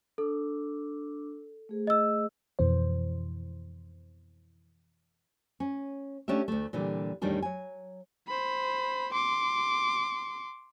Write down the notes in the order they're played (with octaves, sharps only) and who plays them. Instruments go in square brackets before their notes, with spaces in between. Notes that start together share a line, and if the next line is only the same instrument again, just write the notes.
[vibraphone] D4 D6 E6 [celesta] A4
[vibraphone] A3 G#4 C5
[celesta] D#5 E6
[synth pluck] F2 B2 E3 C5
[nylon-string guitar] C#4
A3 C#4 D4 G4 E5
D2 A3
A#2 D3 E3 G3
E2 A2 D#3 G3 D4 G#4
F#3 G#5
[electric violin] C5 B5
C6 D6